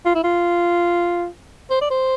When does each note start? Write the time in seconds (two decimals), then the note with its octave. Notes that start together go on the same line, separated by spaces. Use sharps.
0.05 F4
0.15 E4
0.24 F4
1.71 C5
1.81 D5
1.90 C5